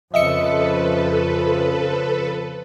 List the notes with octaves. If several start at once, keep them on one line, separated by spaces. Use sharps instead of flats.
F2 C#3 F3 A4 B4 D#5 E5 C#7